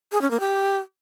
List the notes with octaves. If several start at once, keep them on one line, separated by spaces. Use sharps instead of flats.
G#4
C#4
A#3
G4